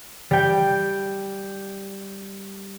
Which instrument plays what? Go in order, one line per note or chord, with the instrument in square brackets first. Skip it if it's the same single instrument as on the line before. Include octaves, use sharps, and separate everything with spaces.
[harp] G3 G5